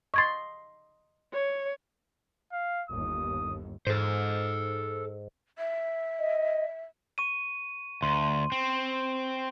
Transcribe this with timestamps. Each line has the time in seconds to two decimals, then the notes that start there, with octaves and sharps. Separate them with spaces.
0.14 D#5 C6 C#6 G#6 A6
1.33 C#5
2.53 F5
2.90 G1 D#2 D#6
3.87 G#2 A4 C5
5.58 E5
6.19 D#5
7.18 C#6 D#7
8.02 D2 C6
8.52 C4